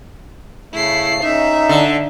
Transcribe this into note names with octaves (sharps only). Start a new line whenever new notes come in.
C#3 A3 E4 C7
C#3 D#4 E5
D3